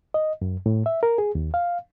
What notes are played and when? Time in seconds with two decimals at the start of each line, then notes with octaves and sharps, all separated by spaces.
0.14 D#5
0.42 F#2
0.66 A2
0.86 E5
1.03 A#4
1.18 G#4
1.35 D#2
1.54 F5